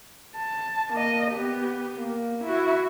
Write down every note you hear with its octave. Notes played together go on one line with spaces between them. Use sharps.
A5
A#3 D#5
B3 G4
A#3
E4 F#4